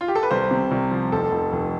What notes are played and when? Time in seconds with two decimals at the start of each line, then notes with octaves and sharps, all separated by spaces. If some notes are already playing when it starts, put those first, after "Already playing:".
0.01 F4
0.08 G4
0.15 A4
0.23 B4
0.31 C2 C5
0.51 C3
0.71 C2
0.91 F3
1.12 F1 A4
1.32 F1
1.53 F1